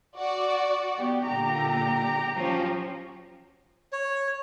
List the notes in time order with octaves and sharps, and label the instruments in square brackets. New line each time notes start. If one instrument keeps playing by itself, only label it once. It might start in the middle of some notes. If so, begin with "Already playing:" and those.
[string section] F#4 D5
[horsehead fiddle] B3 G4
[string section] A#2 D3 [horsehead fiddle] G4 A#5
[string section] F3 F#3 C#4
[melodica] C#5